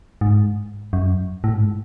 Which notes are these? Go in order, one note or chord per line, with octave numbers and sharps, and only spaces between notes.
G#2
F#2
A2
G#2